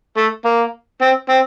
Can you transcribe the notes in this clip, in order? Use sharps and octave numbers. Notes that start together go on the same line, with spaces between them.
A3
A#3
C4
C4